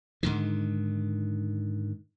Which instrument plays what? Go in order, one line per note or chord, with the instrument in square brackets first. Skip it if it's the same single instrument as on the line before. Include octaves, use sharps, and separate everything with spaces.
[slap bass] G#2 D3 D#3